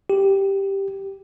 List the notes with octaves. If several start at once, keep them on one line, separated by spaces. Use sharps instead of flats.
G4